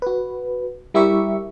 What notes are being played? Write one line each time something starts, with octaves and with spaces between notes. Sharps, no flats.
F#4 B4
G3 E4 G4 A#4 E5 C#6